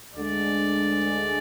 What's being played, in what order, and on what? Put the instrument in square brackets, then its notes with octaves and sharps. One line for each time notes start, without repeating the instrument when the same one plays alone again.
[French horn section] D2 D3 G#3 [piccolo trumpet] D5